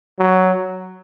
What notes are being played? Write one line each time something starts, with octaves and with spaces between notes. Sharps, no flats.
F#3